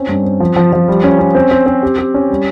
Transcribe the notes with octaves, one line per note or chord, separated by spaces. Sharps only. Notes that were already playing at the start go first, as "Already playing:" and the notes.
Already playing: C4 C#4
G2
C4
F3
F3
F3
G3
C#4
C#4
C4
C4
C4
G4
G4
C#4
G3